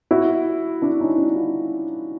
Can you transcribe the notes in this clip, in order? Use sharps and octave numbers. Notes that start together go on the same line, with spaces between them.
E4 F#4
D4 E4
C#4 D#4
D4 E4
D#4 F4